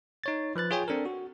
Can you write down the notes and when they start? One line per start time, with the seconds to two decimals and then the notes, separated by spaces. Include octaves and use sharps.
0.24 D#4 C#5 A6
0.56 F3 B4 F#6 A6
0.71 F4 G#4 C#5 G5 G#5
0.88 C4 D4 A4 A#4
1.05 F#4